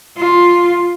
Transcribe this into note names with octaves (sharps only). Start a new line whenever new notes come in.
F4